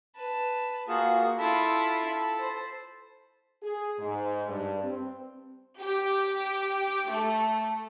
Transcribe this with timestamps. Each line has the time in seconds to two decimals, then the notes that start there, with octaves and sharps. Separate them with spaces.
0.15 B4 A5
0.88 A#3 F4 F#4 G#4
1.39 E4 F4 A4 A5 B5
2.39 C5
3.63 G#4
3.98 G#2
4.46 G2
4.83 C4
5.80 G4
7.10 A3